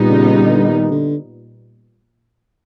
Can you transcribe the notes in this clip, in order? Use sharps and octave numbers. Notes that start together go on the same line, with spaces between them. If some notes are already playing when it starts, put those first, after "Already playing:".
Already playing: A#2 G3 B3 D#4
C#3
D3
D#3
D3